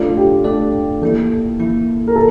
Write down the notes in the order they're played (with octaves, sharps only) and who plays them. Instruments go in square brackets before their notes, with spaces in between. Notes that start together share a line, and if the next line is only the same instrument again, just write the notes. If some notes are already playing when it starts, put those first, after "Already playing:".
Already playing: [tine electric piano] A3 D4 A4 D5 [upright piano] F4
[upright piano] G4
[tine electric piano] A3 D4 A4 D5
[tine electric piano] E3 A#3 E4 [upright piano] A4
[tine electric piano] E3 A#3 E4
[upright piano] A#4
A4